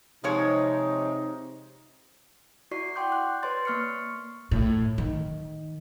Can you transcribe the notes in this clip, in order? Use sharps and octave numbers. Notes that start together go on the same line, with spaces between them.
C3 F3 G#3 D#4 C#5
E4 F#4 D5 C#6 C7
F#5 G5 C6 D6 G6
F#6
B4 C#5 D5 C6 A6
A#3 C#6 F6 C7 C#7
A2
D#3